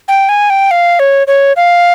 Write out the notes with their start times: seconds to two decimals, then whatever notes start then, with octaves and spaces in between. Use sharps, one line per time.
0.08 G5
0.29 G#5
0.50 G5
0.71 F5
0.99 C#5
1.27 C#5
1.56 F5